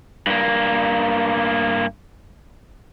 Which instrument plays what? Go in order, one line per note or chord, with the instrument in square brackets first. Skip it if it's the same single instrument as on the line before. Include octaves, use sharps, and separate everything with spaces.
[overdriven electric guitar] G2 A#3